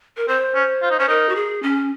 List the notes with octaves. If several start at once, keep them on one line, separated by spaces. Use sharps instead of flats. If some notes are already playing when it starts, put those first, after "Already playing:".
A#4
C4 C5
C#4
F4
D#4
C#4 C5
D#4 A#4
F#4
G#4
C#4